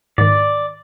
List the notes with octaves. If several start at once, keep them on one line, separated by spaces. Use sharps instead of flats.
G#2 D#3 D5